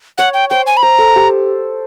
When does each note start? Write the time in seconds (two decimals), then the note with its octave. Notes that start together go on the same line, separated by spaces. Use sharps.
0.18 C#5 F#5
0.34 G5
0.50 C5 G5
0.66 G#5
0.77 B5
0.83 C5 A#5
0.98 A4
1.16 G4